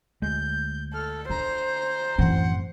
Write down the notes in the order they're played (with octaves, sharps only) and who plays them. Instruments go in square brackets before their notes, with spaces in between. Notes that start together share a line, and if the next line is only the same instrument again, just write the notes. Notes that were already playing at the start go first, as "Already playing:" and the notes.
[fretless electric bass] D2 G#3 [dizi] G6
[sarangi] A4 [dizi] F6
[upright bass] D3 [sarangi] C5 [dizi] A#5
[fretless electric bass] F#2 A2 C4 [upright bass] E3 [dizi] F#5